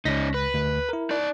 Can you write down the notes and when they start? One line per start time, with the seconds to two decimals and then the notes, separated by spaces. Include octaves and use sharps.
0.05 C#2 C#4 D#4 A#6 B6
0.34 B4
0.54 D2
0.89 E4 A#4
1.11 D#4 D5